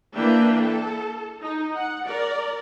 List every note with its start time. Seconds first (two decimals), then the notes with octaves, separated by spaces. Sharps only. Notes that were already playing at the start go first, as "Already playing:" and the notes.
0.14 E3 A#3 D4 B4 E5 G5
0.61 A4
1.41 D#4
1.76 F#5
2.08 A#4 D5